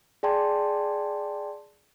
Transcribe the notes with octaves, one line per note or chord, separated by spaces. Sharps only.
G#4 D5 G5 A5 C6